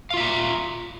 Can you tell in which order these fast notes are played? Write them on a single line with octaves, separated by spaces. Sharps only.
F5 F4 E5 A#5